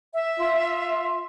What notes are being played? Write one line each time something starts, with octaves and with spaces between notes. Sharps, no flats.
E5
F4